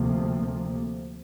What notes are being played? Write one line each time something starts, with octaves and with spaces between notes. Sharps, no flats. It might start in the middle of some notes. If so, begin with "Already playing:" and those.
Already playing: D2 C3 F3 A#3